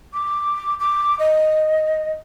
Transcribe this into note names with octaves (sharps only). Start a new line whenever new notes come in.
D6
D6
D#5